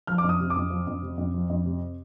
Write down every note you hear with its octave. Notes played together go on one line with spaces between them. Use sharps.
F3 F6
D6
F2
D#6
C3
D6
F2
F3
F2
C3
F2
F3
F2
C3